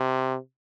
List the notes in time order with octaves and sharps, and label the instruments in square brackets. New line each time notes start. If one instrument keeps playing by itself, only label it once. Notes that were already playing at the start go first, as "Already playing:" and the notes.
Already playing: [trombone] C3